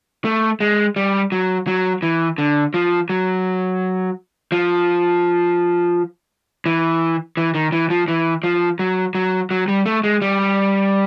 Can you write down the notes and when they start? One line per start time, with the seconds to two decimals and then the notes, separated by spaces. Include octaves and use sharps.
0.25 A3
0.60 G#3
0.96 G3
1.32 F#3
1.67 F#3
2.03 E3
2.38 D3
2.74 F3
3.10 F#3
4.52 F3
6.66 E3
7.37 E3
7.55 D#3
7.72 E3
7.90 F3
8.08 E3
8.43 F3
8.79 F#3
9.15 F#3
9.51 F#3
9.68 G3
9.86 A3
10.04 G#3
10.22 G3